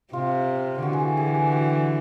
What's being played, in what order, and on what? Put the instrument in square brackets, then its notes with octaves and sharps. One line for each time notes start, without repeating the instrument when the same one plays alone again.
[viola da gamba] C3 [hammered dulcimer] F4
[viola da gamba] D3 E3 [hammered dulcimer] F#4
[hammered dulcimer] G#4
G4
G#4
G4
F#4